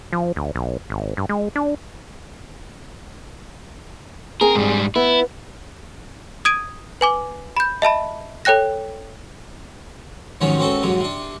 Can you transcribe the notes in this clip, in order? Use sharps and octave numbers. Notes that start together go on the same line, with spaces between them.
F3
D2
B1
G#1
G2
G#3
D4
C4 G#4 A#4
G#2 G3
B3 E4
D#6 G#6 D7 D#7
B4 G#5 D6
B5 G6
D#5 E5 A5 B5
A4 C#5 G5 F#6 A#6
G#2 C3 D#3 F3 F#3 C#4
C#2 C4 C#4 F#4 A4
F2 G#2 C3 F#3
C3 D4